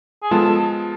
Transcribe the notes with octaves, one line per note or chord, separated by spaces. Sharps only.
G#4
F3 G#3 B3 F4 A4
A4